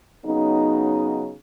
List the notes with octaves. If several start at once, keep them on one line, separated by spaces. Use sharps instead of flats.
C#3 F#3 B3 D#4